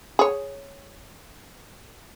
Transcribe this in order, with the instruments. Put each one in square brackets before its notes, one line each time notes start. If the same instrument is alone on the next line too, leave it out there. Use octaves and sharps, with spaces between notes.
[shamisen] G#4 C#5